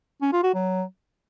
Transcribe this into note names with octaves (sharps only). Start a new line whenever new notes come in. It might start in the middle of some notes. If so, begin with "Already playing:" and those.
C#4
F4
F#4
F#3